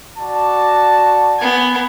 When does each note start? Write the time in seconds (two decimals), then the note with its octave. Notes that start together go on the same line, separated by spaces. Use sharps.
0.18 F#4 D5 A5
1.39 B3 G#5